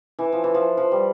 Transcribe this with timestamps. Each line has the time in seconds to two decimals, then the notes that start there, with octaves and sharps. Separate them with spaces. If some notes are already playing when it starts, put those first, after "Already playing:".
0.19 E3
0.32 F3
0.44 E3
0.54 F3
0.77 F3
0.92 G3